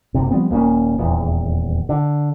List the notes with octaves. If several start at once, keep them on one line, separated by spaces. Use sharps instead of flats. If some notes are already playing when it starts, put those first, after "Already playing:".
F#1 C3
F3 G3 B3 C4
D#1 A#3 C4 C#4
D#1 E2
D3